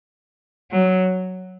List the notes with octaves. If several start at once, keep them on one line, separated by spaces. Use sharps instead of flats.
F#3